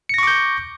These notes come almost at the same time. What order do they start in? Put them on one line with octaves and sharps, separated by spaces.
C#7 A#6 C#6 D6 G6